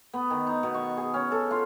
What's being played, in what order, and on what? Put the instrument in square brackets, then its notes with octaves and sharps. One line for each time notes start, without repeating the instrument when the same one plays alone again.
[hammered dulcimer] B3
D#3
D#4
B2
C#6
G#4
C#4
A4
F4